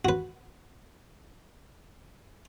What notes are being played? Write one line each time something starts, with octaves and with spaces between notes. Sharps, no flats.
F#4 B4